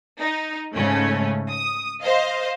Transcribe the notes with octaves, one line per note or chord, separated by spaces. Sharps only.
D#4
G#2 C#3 A3 C#4
D#6
C5 D#5 F5